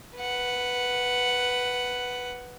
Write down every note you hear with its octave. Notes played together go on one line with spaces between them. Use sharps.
B4 F#5